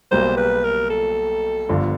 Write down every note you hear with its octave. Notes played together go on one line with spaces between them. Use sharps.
B1 B2 G3 A#3 C5
B4
A#4
A4
G1 G2 D3 F3